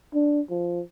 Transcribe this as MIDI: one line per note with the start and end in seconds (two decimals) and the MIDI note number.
0.14 0.41 62
0.50 0.81 53